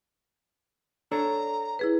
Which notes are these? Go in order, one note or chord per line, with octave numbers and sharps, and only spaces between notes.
D4 A4 C#5 A#5
E4 G#4 B4